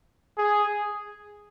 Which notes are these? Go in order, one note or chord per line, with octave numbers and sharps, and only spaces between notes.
G#4